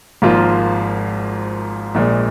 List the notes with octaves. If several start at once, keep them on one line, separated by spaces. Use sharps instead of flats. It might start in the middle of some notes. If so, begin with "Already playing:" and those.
G#1 G#2 F3 A#3 F4
A#1 A#2 G#3